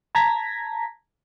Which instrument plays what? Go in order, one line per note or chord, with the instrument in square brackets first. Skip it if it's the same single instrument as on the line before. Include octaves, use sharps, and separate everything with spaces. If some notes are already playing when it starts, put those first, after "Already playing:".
[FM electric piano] A5 A#5 G#6 A#6 B6